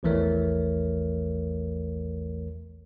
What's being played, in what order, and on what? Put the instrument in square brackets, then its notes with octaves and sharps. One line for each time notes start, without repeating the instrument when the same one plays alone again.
[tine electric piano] A#1 E2 E3 A3 A#4 C#5